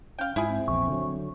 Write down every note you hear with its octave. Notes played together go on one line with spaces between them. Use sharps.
C#4 F5 G5
G#2 E4 F4 G#4
C4
A#1 E2 C#6
D3 F#3